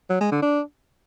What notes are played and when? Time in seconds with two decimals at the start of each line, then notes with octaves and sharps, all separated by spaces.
0.10 F#3
0.20 G#3
0.31 D3
0.42 D4